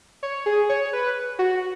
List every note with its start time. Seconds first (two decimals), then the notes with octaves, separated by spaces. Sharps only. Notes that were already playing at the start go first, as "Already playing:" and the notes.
0.23 C#5
0.46 G#4
0.69 C#5
0.93 B4
1.39 F#4